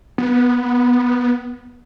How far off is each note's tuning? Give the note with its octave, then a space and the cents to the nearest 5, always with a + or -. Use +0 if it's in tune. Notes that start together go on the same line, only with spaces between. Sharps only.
B3 -5